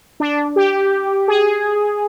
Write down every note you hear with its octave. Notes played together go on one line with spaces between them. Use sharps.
D4
G4
G#4